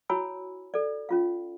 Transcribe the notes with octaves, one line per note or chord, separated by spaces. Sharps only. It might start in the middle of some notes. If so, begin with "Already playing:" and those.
E4 F#4 C#5 G#5 B5 E6
A4 D5
C#4 F4 F5